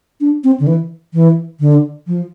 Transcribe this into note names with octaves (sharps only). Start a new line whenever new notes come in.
D4
C4
D3
E3
E3
D3
F3